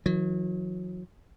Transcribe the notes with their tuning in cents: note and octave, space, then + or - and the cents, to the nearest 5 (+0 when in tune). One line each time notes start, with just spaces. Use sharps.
D#3 +40 F#3 -30